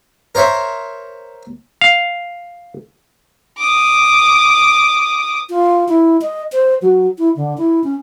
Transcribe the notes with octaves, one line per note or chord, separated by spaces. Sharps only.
A#4 C5 C#5 E5
F5
D6 D#6
F4
E4
D#5
C5
F#3
E4
D3
E4
C#4